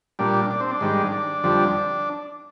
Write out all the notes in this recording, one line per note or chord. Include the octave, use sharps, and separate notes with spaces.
A#2 G3 D4
D4
C4
D4
G#2 D#3 G3
D4
F2 D3 G3